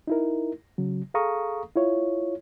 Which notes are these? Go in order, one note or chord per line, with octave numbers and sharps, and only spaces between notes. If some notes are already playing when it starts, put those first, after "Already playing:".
D#4 E4 A#4
C#3 F#3
G#4 A4 F5 A#5 C#6 D#6
E4 F4 C#5